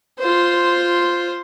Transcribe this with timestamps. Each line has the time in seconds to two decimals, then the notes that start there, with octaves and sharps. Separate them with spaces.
0.19 F4 C5